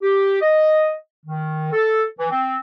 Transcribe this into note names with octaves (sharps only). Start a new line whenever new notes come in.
G4
D#5
D#3
A4
E3
C4